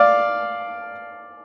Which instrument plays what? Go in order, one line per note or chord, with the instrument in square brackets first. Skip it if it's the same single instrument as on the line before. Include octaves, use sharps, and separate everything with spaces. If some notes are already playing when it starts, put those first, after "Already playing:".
Already playing: [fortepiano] D5 F5